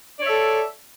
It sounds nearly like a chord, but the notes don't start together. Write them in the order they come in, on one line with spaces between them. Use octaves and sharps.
D5 C#5 E5 A4